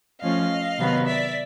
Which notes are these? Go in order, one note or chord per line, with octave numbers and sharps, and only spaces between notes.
F3 A3 C#4 D#5 F5
C3 D#3 F#3 B3
D5 E5